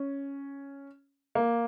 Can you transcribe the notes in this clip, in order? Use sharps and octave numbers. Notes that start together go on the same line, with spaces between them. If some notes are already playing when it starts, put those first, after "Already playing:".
Already playing: C#4
A#3